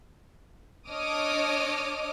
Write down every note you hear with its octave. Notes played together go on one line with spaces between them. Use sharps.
D4 C#5 D#5 D6 D#6 F6